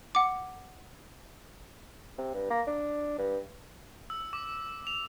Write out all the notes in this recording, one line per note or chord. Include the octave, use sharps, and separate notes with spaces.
F#5 D6
C3
G2
A#3
D4
G2
E6
D6
F7